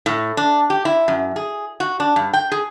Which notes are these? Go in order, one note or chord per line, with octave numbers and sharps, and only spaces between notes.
A2
D4
G4
E4
F#2
G#4
F#4
D4
G2
G5
G#4